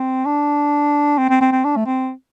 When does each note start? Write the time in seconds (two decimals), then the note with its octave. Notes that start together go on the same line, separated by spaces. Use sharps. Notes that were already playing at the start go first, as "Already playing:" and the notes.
Already playing: C4
0.25 D4
1.18 C4
1.30 C4
1.41 C4
1.52 C4
1.64 D4
1.76 A3
1.86 C4